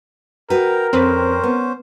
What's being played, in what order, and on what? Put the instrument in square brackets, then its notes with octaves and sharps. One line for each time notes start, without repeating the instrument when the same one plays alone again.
[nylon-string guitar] F#4 B4 [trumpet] A#4 [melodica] G5 A#5
[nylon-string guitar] F2 [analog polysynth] C4 B4 [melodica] C#4 C5
[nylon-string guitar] B3